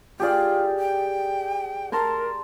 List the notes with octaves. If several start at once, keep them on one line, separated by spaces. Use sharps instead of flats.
F4 G4 G#4 D5
G5
A#4 A5 A#5 C6